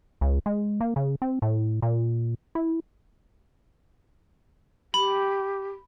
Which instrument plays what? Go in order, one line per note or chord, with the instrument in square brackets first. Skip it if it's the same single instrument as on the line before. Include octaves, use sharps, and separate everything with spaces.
[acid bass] C#2
G#3
A#3
C#3
C4
A2
A#2
E4
[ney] G4 [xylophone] B5